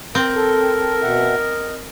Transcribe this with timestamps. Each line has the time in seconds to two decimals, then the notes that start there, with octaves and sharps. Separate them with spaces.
0.15 C4 A#4
0.35 A4
1.02 B2 E5 F#5
1.39 D#5